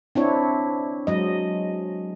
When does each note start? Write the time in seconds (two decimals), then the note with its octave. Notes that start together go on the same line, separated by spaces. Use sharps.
0.15 C4 D4 E4 C#5
1.07 F#3 G#3 D#5